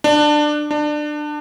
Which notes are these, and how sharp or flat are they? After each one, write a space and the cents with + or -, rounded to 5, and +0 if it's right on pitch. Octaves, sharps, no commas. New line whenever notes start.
D4 +20
D4 +25